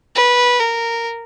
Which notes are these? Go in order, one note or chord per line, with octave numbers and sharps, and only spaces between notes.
B4
A#4